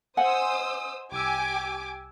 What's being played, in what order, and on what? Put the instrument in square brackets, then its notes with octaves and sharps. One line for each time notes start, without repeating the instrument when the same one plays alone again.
[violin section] C5 D#6 E6 [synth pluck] D#5 G#5 [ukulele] F#5
[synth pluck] C2 E6 [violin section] G4 G#5 D6